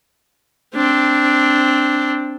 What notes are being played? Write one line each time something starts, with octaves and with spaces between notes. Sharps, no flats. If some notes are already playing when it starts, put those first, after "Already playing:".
C4 D4